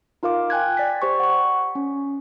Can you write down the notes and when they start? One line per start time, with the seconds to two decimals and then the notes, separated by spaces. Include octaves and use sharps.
0.23 D#4 F4 A#4 F5 D6
0.50 G5 G#5 F#6 G#6
0.77 D5 B6
1.02 G4 C5 D5 C#6
1.20 F#5 C#6
1.75 C#4